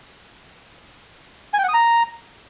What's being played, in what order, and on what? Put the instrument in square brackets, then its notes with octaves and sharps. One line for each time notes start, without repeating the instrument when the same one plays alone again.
[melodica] G#5
G5
F#5
D#6
A#5